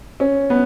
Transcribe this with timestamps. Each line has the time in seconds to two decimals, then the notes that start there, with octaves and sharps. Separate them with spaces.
0.20 C#4
0.50 B3